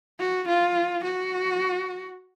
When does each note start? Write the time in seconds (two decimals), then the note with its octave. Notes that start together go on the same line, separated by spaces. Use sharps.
0.20 F#4
0.48 F4
1.04 F#4